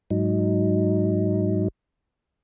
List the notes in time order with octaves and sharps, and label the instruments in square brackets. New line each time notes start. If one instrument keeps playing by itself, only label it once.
[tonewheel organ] G#2 F#3 D#4